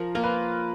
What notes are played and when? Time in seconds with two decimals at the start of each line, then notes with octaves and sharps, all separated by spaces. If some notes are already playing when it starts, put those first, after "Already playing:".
Already playing: F3 A#4
0.15 A#3 F4 A#4
0.24 B4